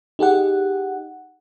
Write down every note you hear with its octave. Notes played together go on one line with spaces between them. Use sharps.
D#4 G4 G#4 F#5